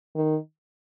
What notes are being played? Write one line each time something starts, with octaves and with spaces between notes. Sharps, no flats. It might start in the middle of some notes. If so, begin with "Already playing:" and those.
D#3